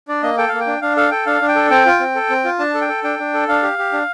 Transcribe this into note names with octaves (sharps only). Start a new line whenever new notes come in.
D4 D5
A#3 D#5
A4 G5
A#3 F5
G5
D4
D4 F5
A4 F5
A4 G5
D4 F5
D4
G5
A4
C4 G5
F4
C4
A4
C4
F4
D4 A5
A4
G5
A4
D4 G5
D4
A4
D4 F5
G4
G4
D4